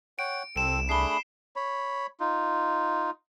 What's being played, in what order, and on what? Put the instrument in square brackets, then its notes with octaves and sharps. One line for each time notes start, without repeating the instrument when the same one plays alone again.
[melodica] C#5 F#5 G5 [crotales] D7
[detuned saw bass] C2 [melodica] C4 A4 [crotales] D7 E7
[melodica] A3 D4 G#4 [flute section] B5 [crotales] C7 G7
[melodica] C#5 B5
D#4 F4